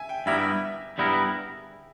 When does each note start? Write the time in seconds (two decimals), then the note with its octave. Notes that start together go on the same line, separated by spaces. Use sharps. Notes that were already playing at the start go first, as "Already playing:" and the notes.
Already playing: E5 G#5
0.09 G5
0.26 G2 G3 B3 E4 A#4 E5
0.98 G2 G3 B3 E4 A#4